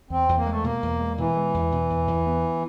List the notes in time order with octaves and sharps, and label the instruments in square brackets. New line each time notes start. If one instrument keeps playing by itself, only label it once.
[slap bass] E2 [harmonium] C4
[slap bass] E2
[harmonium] A#3
[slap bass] G#3 [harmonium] A3
[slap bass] B2 [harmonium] A#3
[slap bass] E2
G#3
[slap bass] B2 [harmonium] E3
[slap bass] G#3
E2
B2
E2
E2
B3